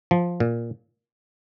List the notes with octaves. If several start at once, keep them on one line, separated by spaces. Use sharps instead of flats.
F3
A#2